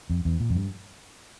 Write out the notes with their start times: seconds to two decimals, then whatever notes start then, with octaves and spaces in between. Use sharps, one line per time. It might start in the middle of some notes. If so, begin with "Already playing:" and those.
0.10 F2
0.25 E2
0.40 A#2
0.50 F2
0.56 G2